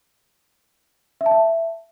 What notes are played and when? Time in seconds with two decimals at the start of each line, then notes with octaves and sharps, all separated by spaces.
1.21 E5
1.26 A5
1.31 E5